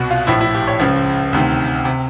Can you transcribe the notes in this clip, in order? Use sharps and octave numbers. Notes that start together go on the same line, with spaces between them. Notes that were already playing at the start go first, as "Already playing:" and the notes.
Already playing: C2 B2 F#4
F4
A#1 A2 F3 E4
E4
G4
C#5
C#2 C#3 F3
D2 C3 D#3
C3